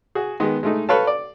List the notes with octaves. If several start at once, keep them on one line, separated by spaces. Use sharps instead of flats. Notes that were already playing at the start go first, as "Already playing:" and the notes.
F#4 G#4
D#3 G#3 B3
G#3 A3 D#4
A4 B4 C#5 F5 A5
D5